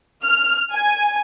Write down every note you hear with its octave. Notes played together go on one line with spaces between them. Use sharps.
F6
G#5